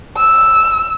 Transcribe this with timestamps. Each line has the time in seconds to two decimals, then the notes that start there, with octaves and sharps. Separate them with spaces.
0.17 E6